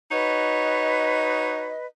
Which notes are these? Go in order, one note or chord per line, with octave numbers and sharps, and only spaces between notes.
D#4 F#4 B4 C#5 D#5